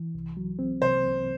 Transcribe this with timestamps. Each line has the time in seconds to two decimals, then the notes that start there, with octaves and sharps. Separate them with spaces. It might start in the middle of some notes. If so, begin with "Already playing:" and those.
Already playing: E3
0.15 C2
0.37 F#3
0.59 C4
0.82 C3 C5
1.04 C2